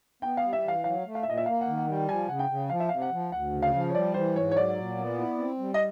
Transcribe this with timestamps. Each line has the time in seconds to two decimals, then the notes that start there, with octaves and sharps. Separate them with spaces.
0.22 B3 G5
0.37 F5
0.43 G3
0.53 E5
0.64 E3 F5
0.84 F#3 F5
1.05 A3
1.15 F5
1.23 E5
1.26 A#2 D#5
1.37 E5
1.46 A#3 F5
1.61 F#5
1.67 D#3
1.78 F#5
1.87 G3 G5
2.08 F3 G#5
2.29 C#3 F#5
2.39 G5
2.50 C#3
2.70 F3 F5
2.80 E5
2.89 C3 F5
3.02 F#5
3.12 F3
3.32 D2 F#5
3.53 C#3
3.62 F5
3.74 F3
3.90 C#5
3.94 G3 D5
4.14 E3 C5
4.36 G#2 C#5
4.51 C#5
4.56 F#3 D5
4.77 A#2
4.97 B3
5.18 E4
5.38 C4
5.59 G3
5.74 D#5